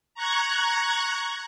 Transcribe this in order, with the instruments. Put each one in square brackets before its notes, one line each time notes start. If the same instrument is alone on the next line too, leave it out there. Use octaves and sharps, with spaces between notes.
[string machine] A#5 C#6 F#6 G#6